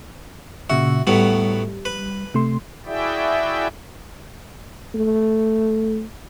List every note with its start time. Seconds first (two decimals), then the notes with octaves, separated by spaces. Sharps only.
0.70 A#2 C#3 F#4 E5
1.07 A2 F#3 G3 B3
1.85 B4
2.34 C3 A3 C6
2.86 E4 F#4 G#4 D5 E5 G5
4.95 A3